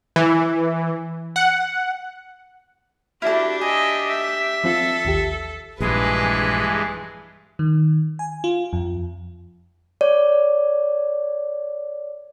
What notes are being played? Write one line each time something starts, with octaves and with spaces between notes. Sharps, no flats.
E3
F#5
D4 E4 F#4 G4 A4 F6
D#5 E5 G#5
E5
F3 C4 F4 A4
A1 D#2 G4
A#1 G2 E3 G#3 G#4 B4
D#3
G#5
F4
F2
C#5 D5